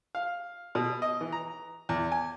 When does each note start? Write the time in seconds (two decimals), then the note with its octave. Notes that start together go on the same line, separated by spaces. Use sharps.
0.15 F5
0.75 B2
1.02 D#5
1.21 E3
1.32 A#5
1.89 E2
2.12 G#5